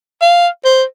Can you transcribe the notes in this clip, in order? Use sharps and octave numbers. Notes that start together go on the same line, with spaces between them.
F5
C5